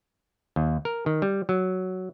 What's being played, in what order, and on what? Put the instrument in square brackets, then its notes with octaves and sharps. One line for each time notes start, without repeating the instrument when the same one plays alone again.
[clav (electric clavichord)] D#2
A#4
D#3
G3
F#3